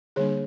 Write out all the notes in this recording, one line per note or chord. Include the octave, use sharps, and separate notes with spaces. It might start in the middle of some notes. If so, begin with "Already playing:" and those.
D3 G3 A#3 D4 G#4